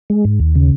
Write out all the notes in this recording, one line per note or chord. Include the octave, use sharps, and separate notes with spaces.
G#3
G#2
D#2
C#3